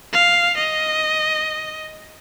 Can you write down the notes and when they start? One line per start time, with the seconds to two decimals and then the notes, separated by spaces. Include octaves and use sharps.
0.13 F5
0.57 D#5